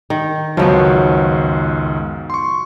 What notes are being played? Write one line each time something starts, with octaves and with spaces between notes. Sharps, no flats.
D#3
C#2 F#2 D#3 F3 F#3 B3
C6 C#6